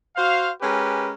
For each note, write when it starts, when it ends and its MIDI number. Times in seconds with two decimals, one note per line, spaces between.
0.16 0.50 66
0.16 0.50 72
0.16 0.50 77
0.62 1.13 56
0.62 1.13 61
0.62 1.13 67
0.62 1.13 70
0.62 1.13 71